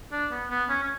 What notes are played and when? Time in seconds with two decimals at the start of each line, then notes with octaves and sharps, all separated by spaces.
0.12 D4
0.31 B3
0.50 B3
0.69 C#4
0.83 C#4